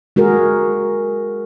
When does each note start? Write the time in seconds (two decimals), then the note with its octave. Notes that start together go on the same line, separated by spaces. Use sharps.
0.16 G#3 F#4 G#4 A#4